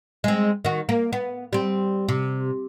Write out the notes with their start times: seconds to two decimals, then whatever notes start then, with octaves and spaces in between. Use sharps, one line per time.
0.24 G#3 C4
0.65 D#3 F#4
0.89 A#3
1.13 B3
1.53 G3 C4
2.08 C3